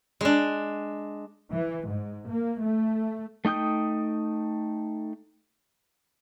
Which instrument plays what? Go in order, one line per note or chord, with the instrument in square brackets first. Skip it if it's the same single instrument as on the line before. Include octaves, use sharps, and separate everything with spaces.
[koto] G#3 D4
[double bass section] E3
G#2
A#3
A3
[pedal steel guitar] A3 D#4 G5 D#6 G6